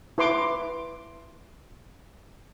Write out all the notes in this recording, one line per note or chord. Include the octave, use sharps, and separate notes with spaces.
E4 B4 C6 D6